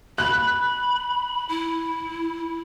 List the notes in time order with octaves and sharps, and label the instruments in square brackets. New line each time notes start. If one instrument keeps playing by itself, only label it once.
[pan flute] B5 [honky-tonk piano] F#6
[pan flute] E4